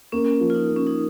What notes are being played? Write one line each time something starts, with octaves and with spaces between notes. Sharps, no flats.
A#3 C#4
F3
F4
D#4
A#3
C#4
D#4